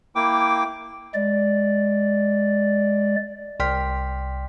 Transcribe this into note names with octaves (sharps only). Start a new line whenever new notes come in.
A#3 E4 G5 D6
G#3 D5
C2 D5 G5 C6 F6 B6